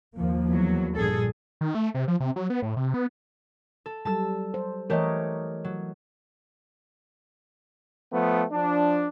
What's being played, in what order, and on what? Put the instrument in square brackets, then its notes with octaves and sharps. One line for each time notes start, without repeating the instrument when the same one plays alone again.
[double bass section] D#2 F3 A#3
[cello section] E2 F#3
[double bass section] A#1 G2 A#2 [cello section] G#4 A4
[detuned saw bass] D#3
A3
C3
F3
C3
F#3
B3
A2
C3
B3
[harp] A4
[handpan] F#3 G3 A4 [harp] A5 E6
[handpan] C5
[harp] E3 A3 G4 [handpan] A#4 C#5 D#5
[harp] F#3
[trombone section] F3 A3 B3
F3 D4